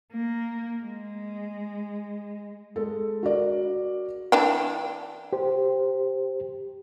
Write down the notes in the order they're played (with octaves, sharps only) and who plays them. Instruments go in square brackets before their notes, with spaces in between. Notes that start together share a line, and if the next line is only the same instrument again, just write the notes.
[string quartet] A#3
G#3
[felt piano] G#3 A4
F#4 A#4 D5
[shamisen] E3 D4 G5
[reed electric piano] G4 C5